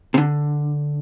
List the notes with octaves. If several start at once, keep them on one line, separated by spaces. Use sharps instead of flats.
C3
D3